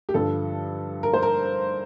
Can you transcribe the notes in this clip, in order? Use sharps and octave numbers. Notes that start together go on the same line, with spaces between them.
G4
G2 D3 F3 A4
A#4
C5
A#4